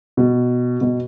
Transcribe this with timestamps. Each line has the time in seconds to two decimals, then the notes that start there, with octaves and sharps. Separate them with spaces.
0.17 B2
0.81 B2